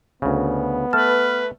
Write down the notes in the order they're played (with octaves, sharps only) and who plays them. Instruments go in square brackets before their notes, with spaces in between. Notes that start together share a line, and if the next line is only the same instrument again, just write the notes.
[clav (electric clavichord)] D2 C#3 [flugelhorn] B3
[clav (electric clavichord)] A3 A5 [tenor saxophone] B4 [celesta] F6